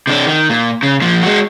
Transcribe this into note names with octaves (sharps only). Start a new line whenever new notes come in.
C3 D4
D#3
A#2
C#3
A#2 F3
G#3 F#4